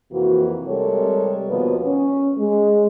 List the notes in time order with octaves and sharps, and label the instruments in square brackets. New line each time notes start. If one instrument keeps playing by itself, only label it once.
[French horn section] F2 C3 E3 A#3 F#4
C3 G3 G#3 A4 A#4 C#5
D#2 B2 F3 A#3 B3
C#4
G#3